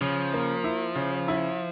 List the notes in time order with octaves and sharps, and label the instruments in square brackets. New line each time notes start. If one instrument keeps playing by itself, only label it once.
[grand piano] C#3 [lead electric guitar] F3
[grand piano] A#3
E4
C#3
E4